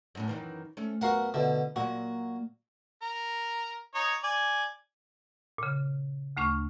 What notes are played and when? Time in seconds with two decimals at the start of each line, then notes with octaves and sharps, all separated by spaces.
0.15 F#2 A2 C#4
0.28 F#2 D#3 E3
0.77 A3 C#4
1.01 F#2 B3 F#4 A#4 F5 F#5
1.34 B2 D3 E5
1.76 A#2 F#3 A#3 F#4
3.02 A#4
3.95 D#4 C#5
4.24 D5 G#5
5.58 A#2 C#3
6.37 D2 A3 D4 C#6 F6